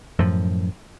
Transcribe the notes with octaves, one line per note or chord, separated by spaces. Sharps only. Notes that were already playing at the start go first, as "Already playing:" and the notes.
F#2 A2 F3